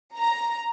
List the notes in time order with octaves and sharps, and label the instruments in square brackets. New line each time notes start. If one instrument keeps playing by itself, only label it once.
[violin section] A#5